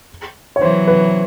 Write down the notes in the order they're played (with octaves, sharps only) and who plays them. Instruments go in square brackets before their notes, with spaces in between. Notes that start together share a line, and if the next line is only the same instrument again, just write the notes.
[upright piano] C#5
[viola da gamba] E3 F#3 [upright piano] C5
[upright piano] B4